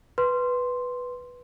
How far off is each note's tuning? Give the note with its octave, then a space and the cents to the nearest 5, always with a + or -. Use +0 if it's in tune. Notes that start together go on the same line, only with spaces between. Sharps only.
B4 +0 C6 +0